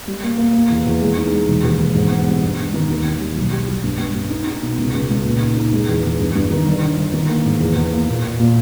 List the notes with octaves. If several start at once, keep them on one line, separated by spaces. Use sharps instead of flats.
G3
A#3
A#3
A#3
E2
E2
G#3
D#4
G#3
E1
D#2
E1
G#2
B3
G3
G2
G2
D#3
D#2
D#3
G3
B1
G3
B1
G2
G2
G2
D#4
D#4
B2
C#2
C#2
C#2
A#2
D#4
D#4
G#3
E2
E2
G2
G2
D#3
G1
G1
G1
D#3
A#3
G#2
E2
E2
A#3
A#2
A#2
A#2